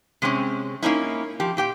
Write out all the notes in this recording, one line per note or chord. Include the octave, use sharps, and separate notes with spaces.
C3 G#3 C4 C#4
A#3 C#4 D#4 E4
F3 G4
A#2 G4 G5